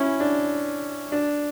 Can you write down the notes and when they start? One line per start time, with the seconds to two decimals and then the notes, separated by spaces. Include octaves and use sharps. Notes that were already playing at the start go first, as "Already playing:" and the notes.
Already playing: C#4 E4
0.20 D4
1.12 D4